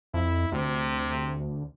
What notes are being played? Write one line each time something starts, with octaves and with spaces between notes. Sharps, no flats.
F2 E4
D2 C3